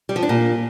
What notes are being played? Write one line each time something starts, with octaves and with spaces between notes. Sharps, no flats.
G3
F3
D4
A#2